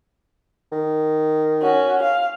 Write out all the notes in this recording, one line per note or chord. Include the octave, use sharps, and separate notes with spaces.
D#3
C#4 F#4
F5